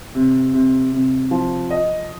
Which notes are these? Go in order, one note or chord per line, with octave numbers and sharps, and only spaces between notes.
C3
C3
C3
F3
D#5